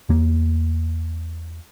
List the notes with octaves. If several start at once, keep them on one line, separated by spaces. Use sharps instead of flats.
E2 A#3